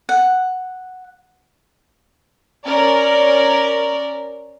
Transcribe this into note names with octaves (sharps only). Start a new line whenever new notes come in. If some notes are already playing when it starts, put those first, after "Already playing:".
F#5
C#4 A#4 D5